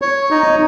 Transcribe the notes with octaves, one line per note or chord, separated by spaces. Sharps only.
C#5
D#4